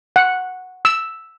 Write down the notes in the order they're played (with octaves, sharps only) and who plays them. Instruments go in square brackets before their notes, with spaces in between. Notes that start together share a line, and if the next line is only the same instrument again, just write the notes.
[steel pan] F#5
E6